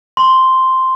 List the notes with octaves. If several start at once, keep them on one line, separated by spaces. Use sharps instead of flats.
C6